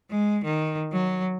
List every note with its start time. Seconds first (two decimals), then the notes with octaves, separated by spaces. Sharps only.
0.10 G#3
0.44 D#3
0.92 F#3